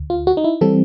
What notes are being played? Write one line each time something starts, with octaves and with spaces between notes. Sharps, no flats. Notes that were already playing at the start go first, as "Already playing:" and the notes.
Already playing: D2
F4
F#4
D#4
E4
E3 G3 C4 A4